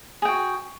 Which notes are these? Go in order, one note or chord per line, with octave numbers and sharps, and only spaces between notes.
F#4 G#4 G5